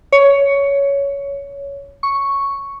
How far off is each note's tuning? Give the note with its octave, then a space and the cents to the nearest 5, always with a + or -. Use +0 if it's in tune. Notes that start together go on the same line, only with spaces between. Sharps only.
C#5 +15
C#6 +0